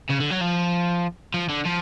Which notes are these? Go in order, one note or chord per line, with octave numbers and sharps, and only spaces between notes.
C#3
D3
F#3
F3
F3
D3
F3